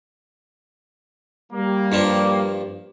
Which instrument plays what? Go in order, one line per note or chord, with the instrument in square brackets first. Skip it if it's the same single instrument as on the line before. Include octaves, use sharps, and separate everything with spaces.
[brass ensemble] G3 A#3
[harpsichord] G2 F3 D4